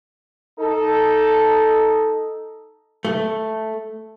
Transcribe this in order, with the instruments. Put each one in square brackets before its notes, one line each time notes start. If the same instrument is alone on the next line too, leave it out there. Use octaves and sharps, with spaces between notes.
[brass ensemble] D#4 A4
[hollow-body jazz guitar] A3